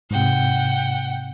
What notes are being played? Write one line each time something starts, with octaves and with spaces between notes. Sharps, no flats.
G#2 C3 F#5 G5